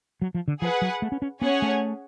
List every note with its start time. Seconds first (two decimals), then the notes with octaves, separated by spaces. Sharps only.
0.22 F#3
0.34 F3
0.48 D3
0.62 F3 G#4 B4 F#5
0.82 F#3
1.02 A3
1.12 C#4
1.22 C#4
1.42 B3 C#4 G#4 C#5 F#5
1.62 A3